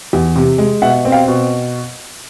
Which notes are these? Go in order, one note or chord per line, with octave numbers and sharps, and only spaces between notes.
E2
C3
G#3
B2 E5 F#5
C4
F5 G5
B2